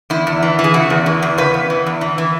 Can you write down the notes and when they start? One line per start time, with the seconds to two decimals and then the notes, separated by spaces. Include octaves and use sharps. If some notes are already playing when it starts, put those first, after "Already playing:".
0.10 E2 E4
0.27 E2
0.43 E3
0.59 E3
0.64 G#4
0.74 C#3 F#4
0.90 E2
1.06 E3
1.23 E2
1.38 C#3 B4
1.54 E2
1.70 E3
1.86 E2
2.01 E3
2.18 E3